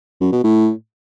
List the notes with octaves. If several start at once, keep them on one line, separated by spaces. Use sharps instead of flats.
F#2
B2
A2